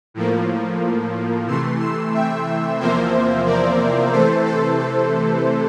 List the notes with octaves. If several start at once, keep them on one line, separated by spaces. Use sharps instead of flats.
A2 F3 A#3
C3 E3 A3 C6 E6
C6 E6
E5 G5
E2 C3 F3 A#3 C5 E5
A#4 D5
C3 E3 A3 A4 C5
A4 C5
A4